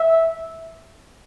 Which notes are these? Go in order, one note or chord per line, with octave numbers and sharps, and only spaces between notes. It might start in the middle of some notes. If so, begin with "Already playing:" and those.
Already playing: E5